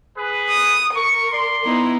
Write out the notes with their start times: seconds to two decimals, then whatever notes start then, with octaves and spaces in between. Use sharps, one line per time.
0.16 G#4 B4
0.49 D#6
0.95 A#4 C#6
1.31 D5 C6
1.65 B3 D#4 E4